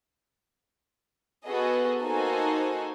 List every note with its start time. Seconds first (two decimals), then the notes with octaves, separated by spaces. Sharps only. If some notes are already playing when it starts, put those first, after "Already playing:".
1.46 B3 F#4 G#4 A4 D#5
2.02 A#3 D#4 F#4 A4 C5 G#5